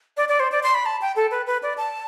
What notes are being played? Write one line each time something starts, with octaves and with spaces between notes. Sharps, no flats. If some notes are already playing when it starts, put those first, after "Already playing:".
D5
D5
C5
D5
C6
B5
A5
G5
A4
B4
B4
D5
A5